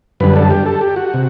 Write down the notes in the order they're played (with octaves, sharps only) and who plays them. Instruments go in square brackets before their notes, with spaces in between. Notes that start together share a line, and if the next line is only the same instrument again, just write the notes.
[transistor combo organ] F#2 D3 G3 B4
A4
G4
A4
G4
F#4
C3